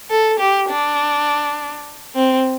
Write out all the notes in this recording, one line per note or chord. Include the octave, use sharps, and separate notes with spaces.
A4
G4
D4
C4